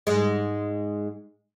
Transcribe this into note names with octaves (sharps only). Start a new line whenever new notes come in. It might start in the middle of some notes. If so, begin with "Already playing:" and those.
G#2 G#3